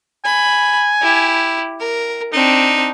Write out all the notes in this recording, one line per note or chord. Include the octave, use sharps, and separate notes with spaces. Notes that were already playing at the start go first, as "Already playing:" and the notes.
G#5 B5
E4 G4
A#4
C4 D4 D#4